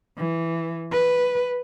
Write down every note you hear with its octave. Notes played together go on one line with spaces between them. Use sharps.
E3
B4